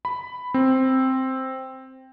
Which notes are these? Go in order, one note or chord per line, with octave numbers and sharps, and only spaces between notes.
B5
C4